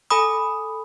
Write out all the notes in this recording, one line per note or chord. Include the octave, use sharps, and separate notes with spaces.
A4 G#5 B5 D#6